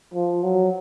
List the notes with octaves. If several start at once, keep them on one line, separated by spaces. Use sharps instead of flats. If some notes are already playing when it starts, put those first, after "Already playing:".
F3
F#3